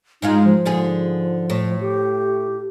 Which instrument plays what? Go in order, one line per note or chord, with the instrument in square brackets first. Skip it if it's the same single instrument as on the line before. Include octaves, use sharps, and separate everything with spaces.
[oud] G#2 G#3 F4 [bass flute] D#4
[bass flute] F3
[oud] G#2 D3 G#4
A2
[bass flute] G4